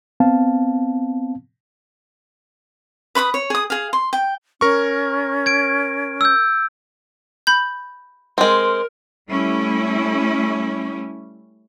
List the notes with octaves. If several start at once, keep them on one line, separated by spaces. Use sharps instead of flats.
B3 C4 F5 A5
B4 B5 C#6 D#6
C#5
G#4 D#6
G#4 F5
C6
G5
C#4 A#4 C#6
G#6 D7
E6 G6
B5 G6
G#3 C4 A#4
G3 A3 C#4 E4